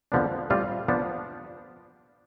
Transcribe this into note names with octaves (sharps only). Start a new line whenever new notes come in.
F2 D3 F3 B3 D4
A2 G3 C4 F4
F3 B3 D4